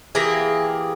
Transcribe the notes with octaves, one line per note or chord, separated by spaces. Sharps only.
E3 A#3 G4 G#4